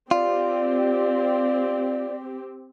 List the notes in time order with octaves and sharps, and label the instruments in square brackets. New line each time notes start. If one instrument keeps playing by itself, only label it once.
[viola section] C4 G4 [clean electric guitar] F4 [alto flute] D5